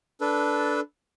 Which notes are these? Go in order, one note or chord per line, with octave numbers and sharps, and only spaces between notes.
D4 A4 B4